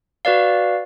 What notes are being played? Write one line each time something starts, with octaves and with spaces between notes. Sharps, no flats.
F#4 B4 D5 F5